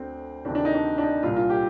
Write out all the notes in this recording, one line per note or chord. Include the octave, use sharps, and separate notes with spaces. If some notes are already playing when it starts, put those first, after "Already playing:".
Already playing: D2 D3 C4
D2 C3 D#3 D4
D4
D#4
D4
D4
D#4
C2 A#2 F4
F4
G4